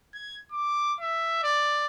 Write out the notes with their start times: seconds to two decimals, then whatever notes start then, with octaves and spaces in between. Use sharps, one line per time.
0.14 G#6
0.52 D6
1.01 E5
1.43 D5